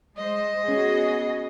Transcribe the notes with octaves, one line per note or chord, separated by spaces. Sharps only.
G#3 C5 D#5
B3 C#4 F#4 G#4